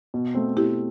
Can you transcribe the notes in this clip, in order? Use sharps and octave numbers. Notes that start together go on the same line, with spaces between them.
B2
A3 C4
B2 E4 G4